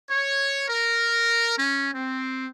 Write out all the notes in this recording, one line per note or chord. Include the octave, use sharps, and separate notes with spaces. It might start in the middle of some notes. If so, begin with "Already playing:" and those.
C#5
A#4
C#4
C4